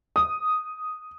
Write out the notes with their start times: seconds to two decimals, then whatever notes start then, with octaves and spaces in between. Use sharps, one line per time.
0.16 D#6